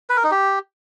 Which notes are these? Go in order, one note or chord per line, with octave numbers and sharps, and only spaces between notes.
B4
A#4
D#4
G4